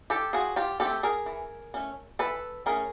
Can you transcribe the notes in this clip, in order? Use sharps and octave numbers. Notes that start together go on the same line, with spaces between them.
G4 A4
F3 F#4 G#4
F4 G4
A3 C4 G4 A4
G#4 A#4
E3
A3 C#4
E3 A4 B4
A3 C#4 G#4 A#4